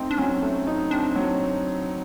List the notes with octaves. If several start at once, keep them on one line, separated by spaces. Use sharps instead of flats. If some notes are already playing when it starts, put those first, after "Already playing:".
Already playing: A3 C4 D#4
D4
F#3 C#4
A3
D#4
C4 D4
F#3